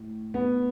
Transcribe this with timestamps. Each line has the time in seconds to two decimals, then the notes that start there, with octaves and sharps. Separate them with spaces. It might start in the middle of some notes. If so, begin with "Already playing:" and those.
Already playing: A2
0.34 B3